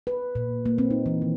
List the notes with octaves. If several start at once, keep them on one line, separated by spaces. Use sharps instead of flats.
B4
A#2
A#3
C4
D#4
E3
D#3